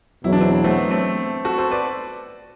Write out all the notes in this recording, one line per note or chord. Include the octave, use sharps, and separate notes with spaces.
E2 B2 F#3 E4
D4
C4 E4
A3 C4
B3
A3 C4
F#4 A4
A4 C5
B4 D5